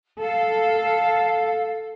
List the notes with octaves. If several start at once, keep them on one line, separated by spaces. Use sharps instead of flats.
A4 F5